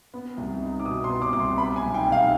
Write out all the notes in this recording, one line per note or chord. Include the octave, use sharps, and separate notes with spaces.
B3
C2
D#4
D6
B2 D#6
C6
B3
D6
C2 D6
C6
B3 B5
G#5
B1
G5
B1
F5